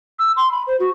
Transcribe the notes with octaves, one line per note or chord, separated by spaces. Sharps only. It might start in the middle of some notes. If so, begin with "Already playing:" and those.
E6
C6
B5
C5
F#4